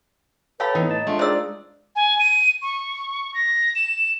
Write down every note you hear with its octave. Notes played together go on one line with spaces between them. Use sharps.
G4 A4 B4 C#5 F5 B5
E3 B3 D#4
A2 D#5 A5
G#3 A3 D4 F4
D#3 G#4 C5 D5 E6
G#5
D#7
C#6
A#6
E7